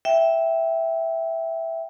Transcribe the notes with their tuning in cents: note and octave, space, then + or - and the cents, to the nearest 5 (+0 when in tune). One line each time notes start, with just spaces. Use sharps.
E5 +0 G5 +0